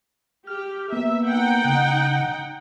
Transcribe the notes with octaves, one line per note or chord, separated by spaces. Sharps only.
G4 F6
A#3 B3 E5
D#4 F#5 G5
C#3 F#6